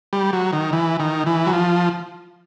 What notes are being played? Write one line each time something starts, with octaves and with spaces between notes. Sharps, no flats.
G3
F#3
D#3
E3
D#3
E3
F#3
F3